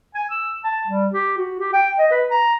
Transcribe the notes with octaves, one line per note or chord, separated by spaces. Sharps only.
G#5
E6
A5
G3
G4
F#4
G4
G5
D#5
B4
A#5